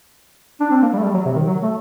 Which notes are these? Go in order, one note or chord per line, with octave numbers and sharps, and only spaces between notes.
D4
C4
A#3
G3
A3
G3
F#3
C3
D#3
F#3
A3